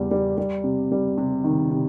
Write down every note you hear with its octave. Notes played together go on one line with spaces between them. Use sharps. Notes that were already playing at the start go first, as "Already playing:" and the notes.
Already playing: E2 G3
G3
G3
C3
G3
C3
D#3
C3